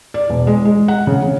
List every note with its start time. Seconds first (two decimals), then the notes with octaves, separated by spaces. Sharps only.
0.14 D5
0.30 E1
0.47 G#3
0.65 G#3
0.88 F#5
1.07 C#3
1.22 C#3